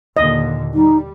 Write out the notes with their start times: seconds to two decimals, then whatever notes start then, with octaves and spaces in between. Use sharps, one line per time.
0.17 D#2 A#2 D3 D#5
0.74 G3 D#4